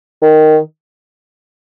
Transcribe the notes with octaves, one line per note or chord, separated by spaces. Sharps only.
D#3